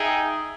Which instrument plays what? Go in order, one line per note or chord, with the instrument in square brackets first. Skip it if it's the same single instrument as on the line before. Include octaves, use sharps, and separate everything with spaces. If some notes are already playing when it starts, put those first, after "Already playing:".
Already playing: [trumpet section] D#4 G#4 E5 G5